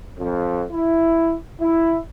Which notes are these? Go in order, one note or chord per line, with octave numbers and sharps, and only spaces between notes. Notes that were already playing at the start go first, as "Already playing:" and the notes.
F2
E4
E4